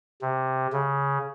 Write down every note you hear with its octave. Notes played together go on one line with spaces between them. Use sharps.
C3
C#3